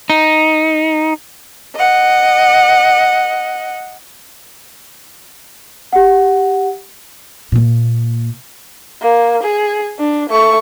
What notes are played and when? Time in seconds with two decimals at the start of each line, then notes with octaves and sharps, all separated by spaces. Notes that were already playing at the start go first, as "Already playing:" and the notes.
0.10 D#4
1.75 D#5 F#5
5.93 G4 F#5
7.52 A#2 A#3
9.02 A#3
9.43 G#4
9.99 D4
10.30 A3 C#6